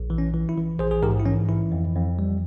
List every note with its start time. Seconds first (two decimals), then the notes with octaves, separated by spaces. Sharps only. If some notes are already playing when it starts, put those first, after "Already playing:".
Already playing: A#1
0.10 E3
0.18 C#4
0.34 E3
0.49 E4
0.57 E3
0.79 A#1 G#4 C5
0.91 G#4
1.02 G#2 G4 A#4
1.20 E4
1.26 E3 C#4
1.49 E3 E4
1.72 F2
1.96 F2
2.19 G3